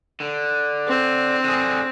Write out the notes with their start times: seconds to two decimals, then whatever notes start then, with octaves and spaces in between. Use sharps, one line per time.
0.20 D3
0.87 C4
1.44 D3 G#4